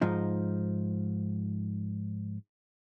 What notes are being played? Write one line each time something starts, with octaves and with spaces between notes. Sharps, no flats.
G#2 F3 D#4